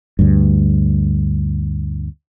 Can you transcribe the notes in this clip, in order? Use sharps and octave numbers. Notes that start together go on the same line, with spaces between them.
D2 G2